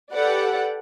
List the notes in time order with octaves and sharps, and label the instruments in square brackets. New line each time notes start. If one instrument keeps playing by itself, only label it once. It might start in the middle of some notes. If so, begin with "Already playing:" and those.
[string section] G4 A4 B4 D5 F#5